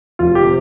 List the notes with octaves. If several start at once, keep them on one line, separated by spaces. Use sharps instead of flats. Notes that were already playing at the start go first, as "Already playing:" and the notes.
F1 F4
G4
C3